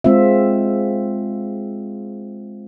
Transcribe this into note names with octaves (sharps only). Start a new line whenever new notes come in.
G#3 C4 F4 E5